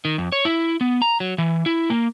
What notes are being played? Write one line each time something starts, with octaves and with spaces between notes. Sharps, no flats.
D#3
F2
C#5
E4
B3
A#5
F#3
E3
E4
A#3